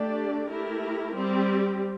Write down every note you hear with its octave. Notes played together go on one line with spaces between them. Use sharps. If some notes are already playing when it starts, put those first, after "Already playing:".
Already playing: A3 D4 G4 D5
A3 E4 G4 A#4
G3 C4 G4